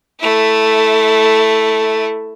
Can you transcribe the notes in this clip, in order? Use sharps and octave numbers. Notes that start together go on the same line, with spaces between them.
A3 E4